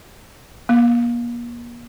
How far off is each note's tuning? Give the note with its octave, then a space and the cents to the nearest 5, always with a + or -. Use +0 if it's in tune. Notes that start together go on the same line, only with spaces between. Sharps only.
A#3 +40